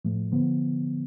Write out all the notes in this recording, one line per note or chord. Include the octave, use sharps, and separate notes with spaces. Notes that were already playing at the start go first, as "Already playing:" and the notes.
A2 F3 A3
D3 F3 B3